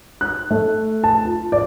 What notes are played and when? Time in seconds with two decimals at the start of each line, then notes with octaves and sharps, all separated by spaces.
0.21 F#6
0.51 A3
1.04 A5
1.25 F4
1.52 D5